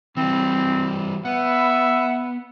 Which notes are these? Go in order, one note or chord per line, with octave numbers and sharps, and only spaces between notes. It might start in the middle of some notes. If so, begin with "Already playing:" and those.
E3 G3 C4
B3 E5 F#5